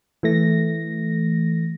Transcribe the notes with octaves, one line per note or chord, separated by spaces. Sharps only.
E3 A3 A#6